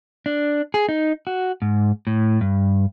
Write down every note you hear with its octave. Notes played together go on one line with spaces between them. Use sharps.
D4
G#4
D#4
F#4
G#2
A2
G2